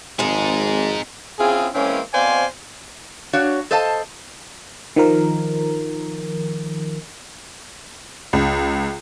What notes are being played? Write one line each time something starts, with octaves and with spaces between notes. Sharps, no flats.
G#1 F2 G#3 D#4 G#4
C4 C#4 E4 F4 G#4
E3 G#3 A#3 C4 C#4
B2 C4 C5 D5 F5 G#5
D4 F#4 C#5 F5
A4 C5 D#5 F5 A5
D#3 F3 A#4
C#2